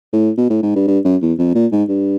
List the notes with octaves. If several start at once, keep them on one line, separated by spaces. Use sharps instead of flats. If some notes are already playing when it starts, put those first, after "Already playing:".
A2
B2
A2
G#2
G2
G2
F#2
E2
F2
A#2
G#2
G2